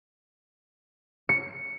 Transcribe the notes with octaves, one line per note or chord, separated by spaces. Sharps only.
C#7